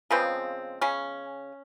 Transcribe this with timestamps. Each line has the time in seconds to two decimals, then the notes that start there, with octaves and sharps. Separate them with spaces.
0.10 C#3 F3 G#3 B3 C4
0.81 C#3 C#4